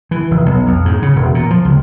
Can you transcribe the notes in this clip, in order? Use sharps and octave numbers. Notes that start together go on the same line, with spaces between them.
E3
F1
B1
F2
G#2
C#3
E1
A#2
F3
C#2